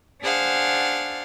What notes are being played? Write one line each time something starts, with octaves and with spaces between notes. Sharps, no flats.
D4 G#4 C5 F5 F#5